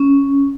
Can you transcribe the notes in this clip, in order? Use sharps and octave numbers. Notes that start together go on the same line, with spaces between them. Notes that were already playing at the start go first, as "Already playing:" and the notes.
Already playing: C#4